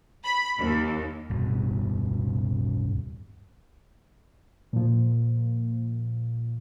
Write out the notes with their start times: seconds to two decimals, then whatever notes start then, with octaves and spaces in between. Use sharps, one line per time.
0.24 B5
0.58 D#2
1.30 D1 G2 B2
4.73 A#2 F3